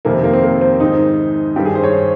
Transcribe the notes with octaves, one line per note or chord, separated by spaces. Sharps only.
F2 C3 D#3 A#3
C4
A#3
C4
A#3
C4
G#2 D#3 D#4
G2 D#3 G4
G#4
C5
C#5